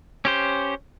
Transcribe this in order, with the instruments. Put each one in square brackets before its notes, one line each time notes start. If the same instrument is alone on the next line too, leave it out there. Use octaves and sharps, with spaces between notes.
[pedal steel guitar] C#4 G4 C5